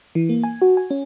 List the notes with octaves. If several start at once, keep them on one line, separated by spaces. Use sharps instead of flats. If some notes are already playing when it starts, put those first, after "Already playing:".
E3
A#3
G#5
F#4
G#5
C#4